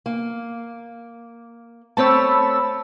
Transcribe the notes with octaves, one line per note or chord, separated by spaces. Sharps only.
A#3
A3 C4 C#5 A5 B5 E6